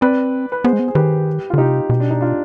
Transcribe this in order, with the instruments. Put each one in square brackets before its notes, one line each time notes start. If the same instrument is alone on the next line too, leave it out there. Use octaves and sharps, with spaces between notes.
[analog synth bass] C4 [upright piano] B4 D5
[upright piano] B4
[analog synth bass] B3 [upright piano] G#4 C5
[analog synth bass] G#3
B3
[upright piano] G#4
[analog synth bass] D#3 [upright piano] G4 B4
[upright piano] F4
[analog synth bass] D3
[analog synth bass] C3 [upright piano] D#4 G4
[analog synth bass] B2
[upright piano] D4
D#4
D4 F4